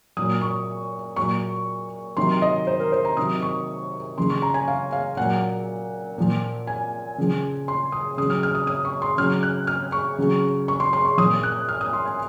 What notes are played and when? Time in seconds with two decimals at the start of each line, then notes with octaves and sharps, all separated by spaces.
0.17 A#2 F#3 D#6
0.42 C#6
1.16 A#2 F#3 C#6
2.17 C3 D#3 F#3 C6
2.42 D#5
2.67 C5
2.80 A#4
2.92 C5
3.05 A#5
3.17 C3 D#3 F#3 D#6
3.42 C#6
4.18 C#3 F3 C6
4.30 C#6
4.42 A#5
4.54 G#5
4.68 F5
4.92 F5
5.17 A#2 F#3 F#5
6.18 A#2 F3
6.67 G#5
7.18 C#3 F3
7.68 C6
7.92 D#6
8.17 C#3 D#6
8.22 F#3
8.30 F6
8.43 F6
8.55 D#6
8.67 D#6
8.85 C#6
9.02 C6
9.18 C#3 F#3 F6
9.43 F#6
9.67 F6
9.92 C#6
10.18 C#3 F#3
10.68 C#6
10.80 C6
10.93 C6
11.05 C#6
11.17 A#2 F3 D#6
11.43 F#6
11.69 F6
11.81 D#6
11.93 C6
12.05 G#5